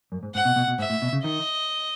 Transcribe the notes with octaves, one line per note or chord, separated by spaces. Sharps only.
F#2
G#2
G#2 F#5
B2
B2
B2
G#2 E5
A2
B2
C#3
D#3 D#5